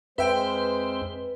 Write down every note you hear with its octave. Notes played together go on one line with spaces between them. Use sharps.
F2 G#3 C4 B4 C5 E5 G5